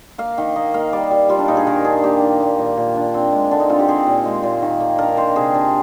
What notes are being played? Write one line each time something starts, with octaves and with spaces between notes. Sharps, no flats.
A#3 F5
D#3
A#3 D#5
A#3 F5
G3 D5
G3
G3 F4
D4
A#2 D#4
G#4
D#3 A#4
D4 G#4
A#3 G4
D#3
A#2
A#2
A#2
D4
C4
G#3
D3 D4
D#4
C4 F4
G4
C4 G#4
A#2
G#3
A#2
D#3
A#3
D4 A#4
D#3 C5
C3 G#4
D4